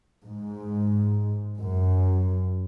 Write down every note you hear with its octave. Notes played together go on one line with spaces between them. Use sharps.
G#2
F#2